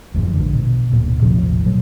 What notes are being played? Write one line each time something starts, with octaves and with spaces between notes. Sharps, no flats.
F#1 F2 G#2 E3
A#1 D3
B2
D1 D2 A#2 D3
A1 D#2 C3 F3
B2 F#3